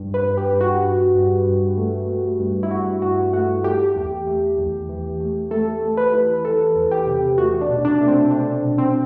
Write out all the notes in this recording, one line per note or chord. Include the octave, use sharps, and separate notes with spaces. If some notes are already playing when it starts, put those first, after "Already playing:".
Already playing: G2
B4
G2
G4
G2
F#4
G2
G2
G2
A3
A3
G2
E4
G2 F#4
G2 F#4
A3 F#4
A3 G4
E2
A3
E2
E3
A3
A3 A4
A3
B4
E3
E3 A4
E2
G4
C3
A3 F#4
D4
B2
D4
A3
C4
A3 D4
B2
C4